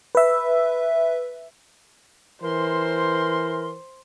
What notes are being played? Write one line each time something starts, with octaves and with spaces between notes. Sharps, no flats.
B4 E5
E3 A#4 C5 C6